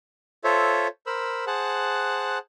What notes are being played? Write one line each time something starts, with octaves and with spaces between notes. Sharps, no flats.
F4 A4 C5 C#5 E5
A#4 C5 B5 E6
G#4 C5 F#5 A5 F#6